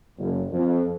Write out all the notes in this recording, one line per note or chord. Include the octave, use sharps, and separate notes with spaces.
F#1
F2